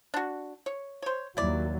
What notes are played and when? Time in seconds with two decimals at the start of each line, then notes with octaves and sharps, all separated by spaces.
0.14 D4 F#4
0.66 C#5
1.02 C5 C#5
1.37 D#2 F#3 E4 D5